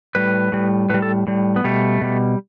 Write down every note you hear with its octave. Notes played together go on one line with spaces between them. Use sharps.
A2 G3 B4
A2 G3
A2 G3 B4
A4
A2 G3
B3
B2 G3 A3
B2 G3